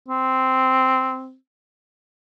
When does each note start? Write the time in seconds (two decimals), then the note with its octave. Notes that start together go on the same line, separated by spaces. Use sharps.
0.08 C4